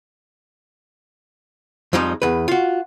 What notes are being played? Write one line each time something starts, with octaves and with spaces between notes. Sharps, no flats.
F2 F3 G3 G#3 D#4
E2 B4
F4 F#4